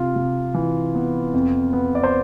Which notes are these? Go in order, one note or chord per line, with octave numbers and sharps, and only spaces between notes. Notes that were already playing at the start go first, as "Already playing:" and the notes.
Already playing: C3 F4
C3
E3
B3
F2
B3
D5
C5